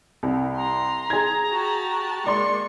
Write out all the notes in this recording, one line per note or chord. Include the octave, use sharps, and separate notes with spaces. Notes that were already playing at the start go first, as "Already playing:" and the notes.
C2
A#5 C6
G#4 G#6
F#4 G4 A5
G#3 A#3 D5 C6 C#6